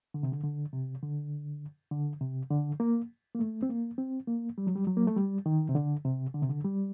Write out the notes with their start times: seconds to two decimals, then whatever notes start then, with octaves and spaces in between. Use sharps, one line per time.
0.14 D3
0.23 C3
0.32 D3
0.44 D3
0.73 C3
1.03 D3
1.91 D3
2.21 C3
2.50 D3
2.80 A#3
3.35 A#3
3.39 A3
3.63 C4
3.69 A#3
3.98 C4
4.28 A#3
4.58 G3
4.67 F#3
4.76 G3
4.87 F#3
4.97 A#3
5.07 A3
5.16 G3
5.46 D#3
5.69 C3
5.75 D3
6.05 C3
6.34 D3
6.42 C3
6.49 D3
6.64 G3